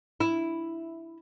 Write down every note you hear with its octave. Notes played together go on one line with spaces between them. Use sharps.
E4